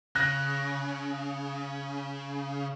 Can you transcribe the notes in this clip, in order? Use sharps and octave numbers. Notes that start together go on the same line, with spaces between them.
C#3 F#6 A#6